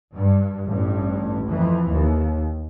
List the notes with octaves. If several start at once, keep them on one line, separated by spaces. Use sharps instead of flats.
G2
A1 G2
F2 E3
D#2